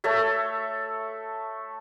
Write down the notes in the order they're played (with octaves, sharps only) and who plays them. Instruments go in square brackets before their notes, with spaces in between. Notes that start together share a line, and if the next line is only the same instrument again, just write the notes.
[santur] A3 A4 C#5 E5